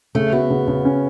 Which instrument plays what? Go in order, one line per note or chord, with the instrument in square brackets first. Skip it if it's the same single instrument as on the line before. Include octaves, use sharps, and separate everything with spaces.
[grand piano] C#3 [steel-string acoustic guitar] A3
[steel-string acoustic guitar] B3 [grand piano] F#4
[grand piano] C#3
C#3
C#4